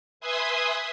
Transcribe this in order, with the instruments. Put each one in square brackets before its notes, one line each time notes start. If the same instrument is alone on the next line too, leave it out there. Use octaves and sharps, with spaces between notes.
[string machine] B4 E5 G#5 C6 D#6